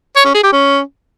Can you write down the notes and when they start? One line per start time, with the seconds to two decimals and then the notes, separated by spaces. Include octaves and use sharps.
0.16 C#5
0.25 C#4
0.34 G#4
0.43 G4
0.53 C#4